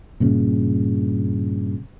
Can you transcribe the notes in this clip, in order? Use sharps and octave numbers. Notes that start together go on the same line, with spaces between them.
G2 A#2 C#3